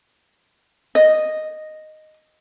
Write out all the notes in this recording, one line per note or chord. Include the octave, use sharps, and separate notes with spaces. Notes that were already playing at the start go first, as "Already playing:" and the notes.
D#5